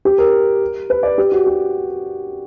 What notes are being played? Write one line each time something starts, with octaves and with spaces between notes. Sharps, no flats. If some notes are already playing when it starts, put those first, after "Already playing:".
G4
A#4
B4
D5
G4
F#4
G4